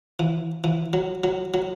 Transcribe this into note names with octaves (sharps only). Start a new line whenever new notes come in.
E3
E3
F#3
F#3
F#3